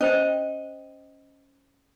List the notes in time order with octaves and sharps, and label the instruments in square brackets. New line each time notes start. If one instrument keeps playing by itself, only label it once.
[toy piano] C#4 C5 G5 [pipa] D#5